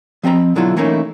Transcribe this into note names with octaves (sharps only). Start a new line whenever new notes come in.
F3 C4 D#5 A#5 B5
B2 D3 F#3 E4 F4
E3 A3 A#3 C#4 D#4 E4